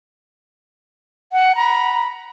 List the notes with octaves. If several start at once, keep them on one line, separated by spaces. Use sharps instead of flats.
F#5
A#5 B5